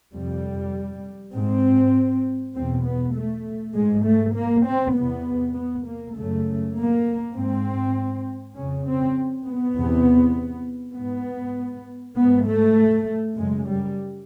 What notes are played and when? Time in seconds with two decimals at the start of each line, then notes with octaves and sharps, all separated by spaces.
0.14 F2 C3 G3
1.34 G#2 C4
2.54 E2 B2 C4
2.84 B3
3.15 A3
3.75 G#2 G#3
4.05 A3
4.35 A#3
4.65 C4
4.95 E2 C3 B3
5.55 B3
5.86 A#3
6.15 F#2 C#3 A3
6.75 A#3
7.35 G#2 C4
8.55 F2 C#3 C#4
8.86 C4
9.46 B3
9.76 E2 C3
10.96 G#2 B3
12.17 G#2 B3
12.46 A3
13.37 F#2 C#3 G#3
13.67 G3